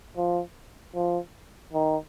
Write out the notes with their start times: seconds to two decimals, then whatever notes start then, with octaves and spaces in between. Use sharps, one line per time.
0.17 F3
0.95 F3
1.73 D#3